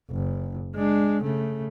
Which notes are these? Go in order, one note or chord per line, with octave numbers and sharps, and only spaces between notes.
F#1
G#3 D4
C#3 A3